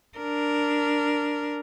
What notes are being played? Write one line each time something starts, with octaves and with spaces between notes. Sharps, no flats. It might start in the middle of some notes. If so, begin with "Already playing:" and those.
D4 A#4